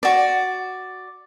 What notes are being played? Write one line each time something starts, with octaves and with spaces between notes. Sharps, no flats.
F#4 D5